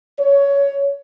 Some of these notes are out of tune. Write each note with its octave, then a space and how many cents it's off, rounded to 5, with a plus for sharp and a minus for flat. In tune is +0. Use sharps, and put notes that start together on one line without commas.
C#5 +15